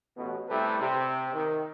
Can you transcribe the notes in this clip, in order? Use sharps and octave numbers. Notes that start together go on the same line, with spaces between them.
A1 B2
C3 G3 A3 E4 A4 B4
C3
D#3